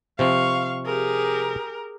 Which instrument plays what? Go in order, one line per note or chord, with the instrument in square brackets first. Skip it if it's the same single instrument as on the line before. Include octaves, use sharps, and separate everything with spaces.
[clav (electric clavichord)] C3 F3 C4 [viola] F5 [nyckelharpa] C#6
[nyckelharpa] G4 G#4 [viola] A#4